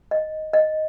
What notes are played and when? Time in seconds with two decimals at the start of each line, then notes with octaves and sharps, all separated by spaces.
0.11 D#5
0.53 D#5